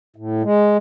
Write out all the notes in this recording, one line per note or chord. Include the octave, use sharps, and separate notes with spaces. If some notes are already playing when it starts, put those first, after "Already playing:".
A2
G#3